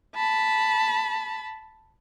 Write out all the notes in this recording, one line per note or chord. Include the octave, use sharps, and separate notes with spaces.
A5 B5